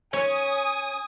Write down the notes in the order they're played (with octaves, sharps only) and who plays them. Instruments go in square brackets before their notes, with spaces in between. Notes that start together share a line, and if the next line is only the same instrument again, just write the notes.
[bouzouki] C#4 [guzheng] C#5 [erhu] G#5 [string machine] D#6